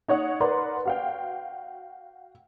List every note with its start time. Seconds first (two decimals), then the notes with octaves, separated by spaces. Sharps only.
0.08 D#4 C#5 F#5 D#6
0.40 A#4 B4 D5 F#5 A#5 C6
0.85 F#4 F5 G5